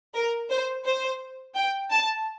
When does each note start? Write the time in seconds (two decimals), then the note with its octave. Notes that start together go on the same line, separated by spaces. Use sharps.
0.15 A#4
0.50 C5
0.85 C5
1.56 G5
1.91 A5